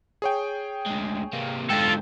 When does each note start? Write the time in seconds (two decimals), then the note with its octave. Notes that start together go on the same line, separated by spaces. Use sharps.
0.22 G#4 C#5 G5
0.87 D2 G#3
1.33 C3 A#3
1.70 G#2 D3 F4 A4 G5